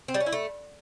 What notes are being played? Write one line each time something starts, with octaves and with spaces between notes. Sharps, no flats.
C4
G3
C#4
E4
A3